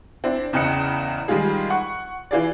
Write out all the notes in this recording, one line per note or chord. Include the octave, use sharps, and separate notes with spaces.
C4 D4 E4
E2 C#3 D#5 G5 F#6 C#7
D#3 G3 G#3 F4 G#4
F#5 C#6
E3 F4 G#4 D5